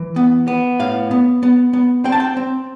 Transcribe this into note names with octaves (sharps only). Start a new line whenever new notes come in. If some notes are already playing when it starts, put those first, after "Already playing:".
Already playing: E3
B3
B3
A2 F5
B3
B3
B3
C4 G5
A5
G5
C4